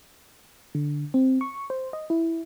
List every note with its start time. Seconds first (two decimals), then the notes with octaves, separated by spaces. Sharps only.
0.75 D3
1.14 C4
1.41 C#6
1.70 C5
1.93 D#5
2.10 E4